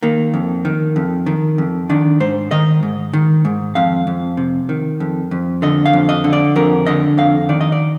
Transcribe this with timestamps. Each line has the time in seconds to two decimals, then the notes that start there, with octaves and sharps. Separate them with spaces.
0.02 D#3 A#3
0.34 F2
0.65 D#3
0.96 F2
1.26 D#3
1.58 F2
1.89 D#3 D4
2.20 G#2 C5
2.51 D#3 D#5
2.83 G#2
3.13 D#3
3.45 G#2
3.75 F2 F5
4.07 F2
4.37 C3
4.69 D#3
5.00 F2
5.31 F2
5.62 D3 D#5
5.86 F5
5.93 F2
6.09 D#5
6.24 D3
6.33 D5
6.56 F2 A#4
6.87 D3 D#5
7.18 F2 F5
7.49 D#3 D5
7.61 D#5
7.72 D5